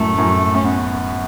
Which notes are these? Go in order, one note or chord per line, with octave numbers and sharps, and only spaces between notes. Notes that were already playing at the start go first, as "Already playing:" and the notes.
Already playing: F#2 A2 A3
F#2 A2
C#4
B3